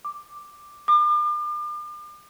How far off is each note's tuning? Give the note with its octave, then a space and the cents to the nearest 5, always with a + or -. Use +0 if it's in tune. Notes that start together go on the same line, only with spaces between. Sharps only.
D6 +5
D6 +40